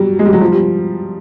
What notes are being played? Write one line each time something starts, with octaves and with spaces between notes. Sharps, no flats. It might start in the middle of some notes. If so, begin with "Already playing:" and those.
Already playing: F#3 G3
G#3
G3
F#3
F3
G3